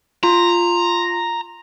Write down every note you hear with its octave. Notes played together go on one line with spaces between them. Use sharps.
F4 A#5